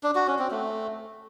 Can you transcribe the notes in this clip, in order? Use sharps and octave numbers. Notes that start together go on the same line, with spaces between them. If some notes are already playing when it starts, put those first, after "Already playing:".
D4
F#4
C#4
C4
A3